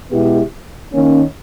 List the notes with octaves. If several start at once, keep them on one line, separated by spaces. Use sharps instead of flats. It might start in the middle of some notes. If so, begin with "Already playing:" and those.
B2 G#3 B3 E4 G4
D#3 A#3 C#4